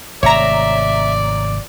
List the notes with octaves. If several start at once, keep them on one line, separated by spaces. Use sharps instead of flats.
G#1 C3 A3 C#5 D5 E5 A#5